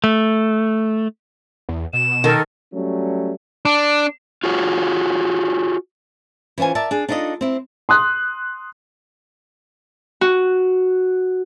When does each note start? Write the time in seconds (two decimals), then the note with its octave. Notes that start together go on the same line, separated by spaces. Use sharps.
0.04 A3
1.69 E2
1.93 B2 E7
2.24 D#3 A4 A#4 G5
2.74 F#3 G3 A3 C#4
3.65 D4
4.44 F4 F#4 G#4 C#5
6.58 E3 C#4 F4 C5 G#5
6.75 A#4 D5 E5 A5
6.91 D4 G#4
7.09 D4 D#4 F4 A4 D#5
7.41 C4 E4
7.89 C6 D#6 F#6
10.21 F#4